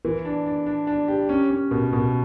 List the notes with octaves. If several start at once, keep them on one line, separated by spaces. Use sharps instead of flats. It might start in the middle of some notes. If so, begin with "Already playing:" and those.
E3
D4
D4
D4
D4
G4
C#4
C#4
B2
B2